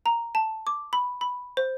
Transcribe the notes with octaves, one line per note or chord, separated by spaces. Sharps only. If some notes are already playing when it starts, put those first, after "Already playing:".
A#5
A5
D6
B5
B5
C5